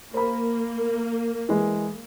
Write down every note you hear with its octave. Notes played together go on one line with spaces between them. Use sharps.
A#3 C5 B5
E3 G#3